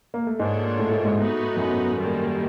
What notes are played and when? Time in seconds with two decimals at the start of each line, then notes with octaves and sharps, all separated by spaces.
0.14 A#3
0.27 A3
0.39 G#2 G#3 A#3 D4 F4 A4 C#5
0.78 A2 A3
0.91 A2 A3
1.04 G#2 G#3
1.17 A2 A3 B3 D#4 F#4 B4
1.57 F#2 F#3
1.95 D#3 G3 A#3